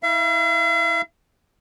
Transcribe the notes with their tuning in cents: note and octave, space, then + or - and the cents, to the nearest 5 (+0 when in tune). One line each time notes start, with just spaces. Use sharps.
E4 -35 F5 -45